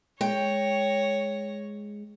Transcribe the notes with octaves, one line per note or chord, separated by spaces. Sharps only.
G#3 C#5 G5 A#6